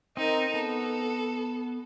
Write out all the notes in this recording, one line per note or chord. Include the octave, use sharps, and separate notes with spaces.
C4 D#4 A#4 D#5
B3 A4